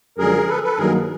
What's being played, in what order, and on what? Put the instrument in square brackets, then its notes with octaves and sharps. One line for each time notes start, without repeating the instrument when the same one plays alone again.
[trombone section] F#2 D3 F3 G#3 [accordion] G#4 A#4
[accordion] A4 B4
A4 B4
[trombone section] G2 D#3 F#3 A#3 [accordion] G#4 A#4